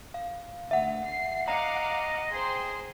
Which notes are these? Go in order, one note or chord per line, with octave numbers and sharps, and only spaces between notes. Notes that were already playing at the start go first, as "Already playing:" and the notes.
F5
D2 E5 F#5
C7
D#5 F5 F#5 A#5 D6
G#4 C5 G5 C6